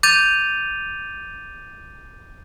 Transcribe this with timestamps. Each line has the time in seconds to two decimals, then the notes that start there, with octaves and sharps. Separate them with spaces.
0.03 D6 G6 A6 D#7 F7